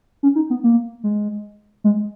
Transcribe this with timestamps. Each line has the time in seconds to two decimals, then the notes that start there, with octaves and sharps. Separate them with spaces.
0.23 C#4
0.35 D#4
0.50 B3
0.64 A#3
1.04 G#3
1.84 G#3